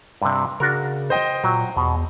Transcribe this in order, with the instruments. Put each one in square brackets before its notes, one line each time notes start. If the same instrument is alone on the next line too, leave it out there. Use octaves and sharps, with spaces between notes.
[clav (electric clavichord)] G2 C3
[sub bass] C#3 [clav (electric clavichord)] D4 F#4 A#4
[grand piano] C5 D#5 G5
[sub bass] A#2 [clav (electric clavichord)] F#3 F#4
[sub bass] E2 [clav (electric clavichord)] B2